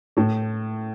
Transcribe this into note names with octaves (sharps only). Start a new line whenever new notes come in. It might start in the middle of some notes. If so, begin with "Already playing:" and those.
A2 A3